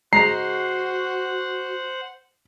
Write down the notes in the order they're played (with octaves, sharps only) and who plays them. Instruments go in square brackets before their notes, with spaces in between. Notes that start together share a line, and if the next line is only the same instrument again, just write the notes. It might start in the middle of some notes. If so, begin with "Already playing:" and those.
[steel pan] G#3 A#5 [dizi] F#4 [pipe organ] C5 F#5 [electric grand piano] C7